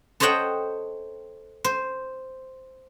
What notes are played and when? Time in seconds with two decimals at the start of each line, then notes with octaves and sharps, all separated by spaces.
0.20 A4 C5 C#5 D#5 F#5 G5
1.65 C5